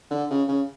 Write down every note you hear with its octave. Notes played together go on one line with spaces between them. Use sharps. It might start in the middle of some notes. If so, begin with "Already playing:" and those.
D3
C#3
C#3